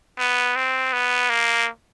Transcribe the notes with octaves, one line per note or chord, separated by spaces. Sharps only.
B3
C4
B3
A#3